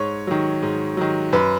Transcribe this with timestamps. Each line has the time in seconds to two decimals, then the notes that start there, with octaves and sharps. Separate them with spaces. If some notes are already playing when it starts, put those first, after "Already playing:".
Already playing: G#2 C#5
0.27 D#3 F#3
0.62 G#2
0.97 D#3 F#3
1.33 F#2 B4